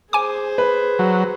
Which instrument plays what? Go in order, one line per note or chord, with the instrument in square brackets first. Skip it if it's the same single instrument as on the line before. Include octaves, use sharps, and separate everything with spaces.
[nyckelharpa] G#4 C5 [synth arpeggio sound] G#5 D6
[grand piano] B4
[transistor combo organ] F#3